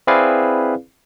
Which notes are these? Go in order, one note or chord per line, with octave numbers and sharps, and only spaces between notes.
C4 E4 G#4 B4 D5 F5